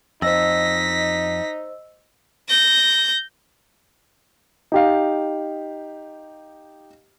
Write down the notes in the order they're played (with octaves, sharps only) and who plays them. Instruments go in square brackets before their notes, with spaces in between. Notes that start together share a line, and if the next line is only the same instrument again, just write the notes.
[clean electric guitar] F2 [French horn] D#4 [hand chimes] C5 D#5 E6 [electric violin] A#6 B6
[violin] G6 A#6
[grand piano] D#4 G4 F5